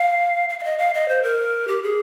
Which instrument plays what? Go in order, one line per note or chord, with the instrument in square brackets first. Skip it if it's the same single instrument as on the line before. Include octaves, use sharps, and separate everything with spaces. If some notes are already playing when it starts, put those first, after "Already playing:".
Already playing: [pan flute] F5
F5
F5
D#5
F5
D#5
C5
A#4
G4
G#4